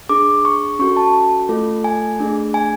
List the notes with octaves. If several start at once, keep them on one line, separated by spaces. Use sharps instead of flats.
D4 G#4 D6
C#6
C#4 F#4 A4 C#6
A5
A3 F4 A4
G#5
A3 D4 G#4
G#5